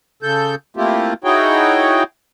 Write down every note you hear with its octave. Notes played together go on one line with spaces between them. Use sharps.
C#3 A4 G6
A3 A#3 C4 E4 F4 G4
D#4 E4 F#4 G#4 C#5 G5